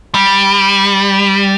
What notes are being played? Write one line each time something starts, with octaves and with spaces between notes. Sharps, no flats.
G3